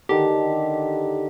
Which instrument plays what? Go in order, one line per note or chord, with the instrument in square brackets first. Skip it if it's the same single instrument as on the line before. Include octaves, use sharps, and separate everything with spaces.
[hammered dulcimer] D3 D#3 [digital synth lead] G4